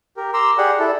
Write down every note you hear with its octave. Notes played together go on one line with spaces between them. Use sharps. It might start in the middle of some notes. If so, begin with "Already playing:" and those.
G4 A#4
A#5 C6 D6 E6
G4 G#4 D5 F#5
E4 A4